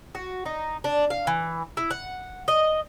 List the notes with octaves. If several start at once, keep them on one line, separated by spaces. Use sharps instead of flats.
F#4
D#4
D4
F5
E3
E4
F#5
D#5